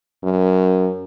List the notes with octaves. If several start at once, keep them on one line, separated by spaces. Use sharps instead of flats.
F#2